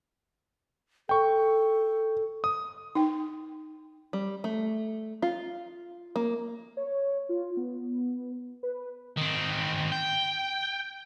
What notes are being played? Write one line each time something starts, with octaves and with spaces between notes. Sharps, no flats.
A4 G5 C#6
D#6
D#4 G5
G3
A3
F4
A#3
C#5
F4
B3
B4
D#3 C4
G5